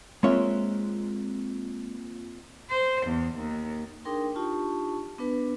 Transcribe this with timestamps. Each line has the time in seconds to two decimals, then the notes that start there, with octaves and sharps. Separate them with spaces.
0.23 G#3 A#3 C4 F4 C#5 E5
2.69 C5
3.07 E2
3.36 D#2
4.05 D4 D#4 G#4 A#4 G5 C6
4.35 D4 D#4 F4 G4 A5 C#6
5.18 B3 D4 B4